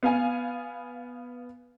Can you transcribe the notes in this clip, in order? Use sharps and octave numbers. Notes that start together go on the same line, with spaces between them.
B3 F5 G#5